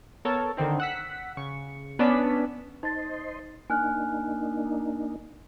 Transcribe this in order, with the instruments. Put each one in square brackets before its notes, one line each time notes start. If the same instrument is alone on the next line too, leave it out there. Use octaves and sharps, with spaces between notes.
[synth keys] B3 A4 A#4 C#5 A5
D3 D#3 C4 D#4
F#5 E6 B6
C#3 C#6
B3 C#4 D4 D5 E6 B6
[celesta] D#4 A6 [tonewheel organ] C5 D#5 C6
[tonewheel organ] A#3 D4 D#4 [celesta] G#5 F6 F#6